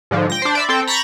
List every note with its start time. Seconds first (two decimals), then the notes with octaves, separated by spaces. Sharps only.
0.11 G#2 D3 F3
0.30 G5 A#6
0.42 D4 C5
0.55 D5 E5 B5
0.69 C4 A4 G5
0.87 A#5 B5 C#6 G6 A6 A#6